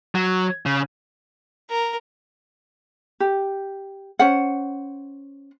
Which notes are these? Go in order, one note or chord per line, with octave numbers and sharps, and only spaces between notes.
F#3
C#3
A#4
G4
C#4 C5 F#5